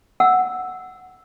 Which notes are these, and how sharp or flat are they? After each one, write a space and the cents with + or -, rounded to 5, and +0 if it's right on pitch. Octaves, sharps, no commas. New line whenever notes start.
F#5 +0 E6 +0